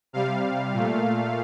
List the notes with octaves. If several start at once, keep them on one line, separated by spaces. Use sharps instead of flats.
C3 G3 F5
A#2 A3